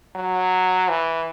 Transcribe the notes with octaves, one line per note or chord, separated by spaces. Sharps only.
F#3
E3